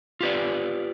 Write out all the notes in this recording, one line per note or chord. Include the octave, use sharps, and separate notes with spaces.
F4 G4 B4 D5